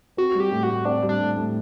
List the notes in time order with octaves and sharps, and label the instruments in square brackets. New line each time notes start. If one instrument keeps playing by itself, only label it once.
[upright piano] C4 [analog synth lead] F#4
[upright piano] G3 [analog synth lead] G4
[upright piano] A2
[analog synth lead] F#4
[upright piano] A2
[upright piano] C4 [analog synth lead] D4
[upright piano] G3
[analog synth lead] D4
[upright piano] A2
A2